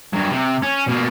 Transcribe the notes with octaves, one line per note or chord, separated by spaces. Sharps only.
G2 F#3
C3
C#4
B2 A#3